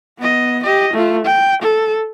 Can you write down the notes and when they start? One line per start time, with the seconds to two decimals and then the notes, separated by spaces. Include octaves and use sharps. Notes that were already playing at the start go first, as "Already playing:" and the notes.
0.18 B3 D#5
0.64 G4 D#5
0.93 A3 F4
1.25 G5
1.62 A4